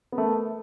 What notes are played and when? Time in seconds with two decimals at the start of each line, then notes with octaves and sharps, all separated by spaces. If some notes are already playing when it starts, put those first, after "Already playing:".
0.12 B3
0.15 A#4
0.18 A3